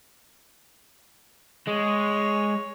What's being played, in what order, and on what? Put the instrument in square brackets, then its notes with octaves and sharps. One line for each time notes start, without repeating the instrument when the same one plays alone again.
[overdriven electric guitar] G#3 [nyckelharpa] C#5